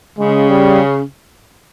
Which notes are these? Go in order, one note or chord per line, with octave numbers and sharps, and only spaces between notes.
C#3 G#3
G3